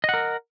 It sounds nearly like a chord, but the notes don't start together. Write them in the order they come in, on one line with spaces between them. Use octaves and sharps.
D#5 F#5 A#4